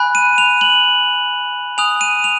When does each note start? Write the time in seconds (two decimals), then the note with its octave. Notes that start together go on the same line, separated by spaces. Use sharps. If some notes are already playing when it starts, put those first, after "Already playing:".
Already playing: G#5 B5 F#6
0.15 D#7
0.38 F7
0.61 F#7
1.78 G#5 D#6 F#6 F7
2.01 D#7
2.24 F7